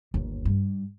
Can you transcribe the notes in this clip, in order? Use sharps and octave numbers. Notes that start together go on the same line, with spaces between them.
G1 D#2
G2